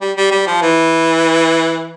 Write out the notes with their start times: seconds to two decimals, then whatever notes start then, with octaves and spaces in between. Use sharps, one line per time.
0.01 G3
0.17 G3
0.31 G3
0.47 F3
0.62 E3